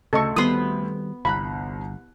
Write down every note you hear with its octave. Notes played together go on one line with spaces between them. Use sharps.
D2 C#3 A4 D#5 C#6
D#3 G3 B3 C4 B4 C6 D#6
G1 C2 A#5 B5 F#6